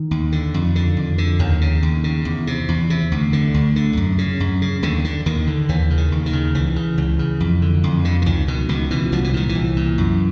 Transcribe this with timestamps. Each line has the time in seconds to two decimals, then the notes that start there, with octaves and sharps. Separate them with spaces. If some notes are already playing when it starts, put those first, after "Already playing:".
Already playing: D#3
0.11 D#2
0.32 D3
0.54 F2
0.76 D3
0.97 F2
1.18 D3
1.39 D#2 D#3
1.61 C#3
1.83 D#2
2.04 C#3
2.25 E2
2.47 C3
2.69 E2
2.90 C3
3.12 D2
3.33 D3
3.54 D2
3.76 D3
3.97 F#2
4.18 C#3
4.40 F#2
4.62 C#3
4.83 D#2 D3
5.04 D3
5.26 D#2 D#3
5.47 D3
5.69 D#2 E3
5.90 C#3
5.97 D#3
6.12 D#2
6.26 D#3
6.33 C#3
6.54 C#2 E3
6.76 C#3
6.98 C#2
7.19 C#3
7.40 F2
7.62 D3
7.84 F2
8.05 D3
8.22 D3
8.26 C#2 D#3
8.48 B2 D#3
8.69 C#2 D#3
8.91 B2 E3
9.12 C2 F3
9.24 E3
9.34 A#2 D#3
9.49 E3
9.55 C2
9.77 A#2
9.98 F#2